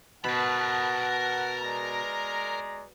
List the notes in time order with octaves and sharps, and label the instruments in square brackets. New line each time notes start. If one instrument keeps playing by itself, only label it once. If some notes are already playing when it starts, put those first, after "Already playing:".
[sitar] B2 [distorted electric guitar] A#4 B5 [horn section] F#5 [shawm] A5
[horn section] G#3 D5 A#5